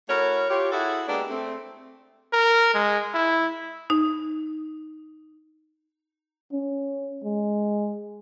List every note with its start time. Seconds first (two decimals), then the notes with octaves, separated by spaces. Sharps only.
0.09 A3 E4 F#4 A#4 C#5
0.50 F4 G4 C#5
0.72 E4 F#4 G#4 A4 E5 F#5
1.07 G#3 A#3 B3 D4 G4 A4
1.29 A3 C4
2.33 A#4
2.74 G#3
3.14 E4
3.90 D#4
6.53 C#4
7.24 G#3